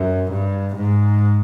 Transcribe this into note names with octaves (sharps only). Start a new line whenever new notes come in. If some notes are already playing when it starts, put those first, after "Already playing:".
Already playing: F#2
G2
G#2